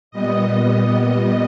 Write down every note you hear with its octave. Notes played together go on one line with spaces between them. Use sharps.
A#2 G3 B3 D#5